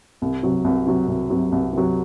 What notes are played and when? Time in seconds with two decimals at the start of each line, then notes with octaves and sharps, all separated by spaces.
0.22 C2
0.43 C3 F#3
0.64 C2
0.86 C3 F#3
1.08 C2
1.30 C3 F#3
1.52 C2
1.73 C3 F#3